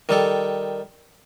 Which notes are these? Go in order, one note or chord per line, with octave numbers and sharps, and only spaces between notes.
D#3 G3 A4